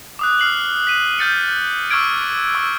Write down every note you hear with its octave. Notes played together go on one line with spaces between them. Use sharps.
D6 D#6 F#6
F6 C7 F#7
B6 D#7
F6 G6 A6 C#7
C#6 D6 E6 F6 G#6 D7
C#6 E6